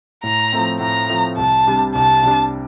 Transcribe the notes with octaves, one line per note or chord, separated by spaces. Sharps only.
A2 A#5
F3 A3 C4
A2 A#5
F3 A3 C4
C2 A5
C3 G3 D4
C2 A5
C3 G3 D4